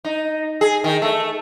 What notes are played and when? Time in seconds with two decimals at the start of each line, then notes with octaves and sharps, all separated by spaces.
0.05 D#4
0.61 G#4
0.84 D#3
1.02 A3